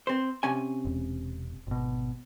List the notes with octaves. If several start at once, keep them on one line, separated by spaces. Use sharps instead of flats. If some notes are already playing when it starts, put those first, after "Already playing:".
C4 C5
C3 C#4 G#5
E1
G#1 B2